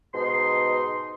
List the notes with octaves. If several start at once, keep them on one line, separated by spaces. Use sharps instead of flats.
G#2 B2 D#4 C6